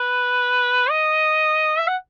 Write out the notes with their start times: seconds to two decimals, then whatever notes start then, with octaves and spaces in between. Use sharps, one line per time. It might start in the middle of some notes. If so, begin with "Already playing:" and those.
Already playing: B4
0.90 D#5
1.79 E5
1.87 F#5